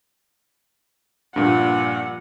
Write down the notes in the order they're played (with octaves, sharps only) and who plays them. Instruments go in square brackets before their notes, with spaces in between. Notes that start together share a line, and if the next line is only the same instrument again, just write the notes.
[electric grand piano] G2 A#2 [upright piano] F3 D4 [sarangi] F#5